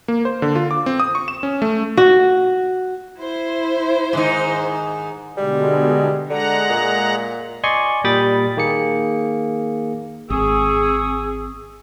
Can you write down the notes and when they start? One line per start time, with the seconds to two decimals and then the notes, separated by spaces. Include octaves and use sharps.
0.08 A#3
0.25 C5
0.42 D3
0.56 F4
0.71 D6
0.86 C4
1.00 D#6
1.15 C#6
1.28 E7
1.43 C#4
1.62 A3
1.97 F#4
3.19 E4 C5
4.13 G#2 D#3 D#4
5.37 B2 D3 G3 G#3
6.30 D3 G#3 F#5 A#5
6.70 A#2
7.64 D5 D#5 G#5 C6 C#6
8.04 A#2 G3 G5 B5 D#6 A6
8.57 D#3 A#3 G#4 C#7
10.30 G#1 C4 G#4 C#6 D#6 E6